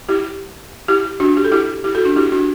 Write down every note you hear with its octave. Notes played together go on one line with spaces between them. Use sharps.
E4 G4
E4 G4
D4 F#4
G4
A4
E4 G4
E4 G4
F#4 A4
D4 F#4
E4 G4
D4 F#4